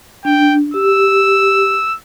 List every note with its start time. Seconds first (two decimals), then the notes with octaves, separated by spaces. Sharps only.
0.25 D4 G5
0.74 G4 E6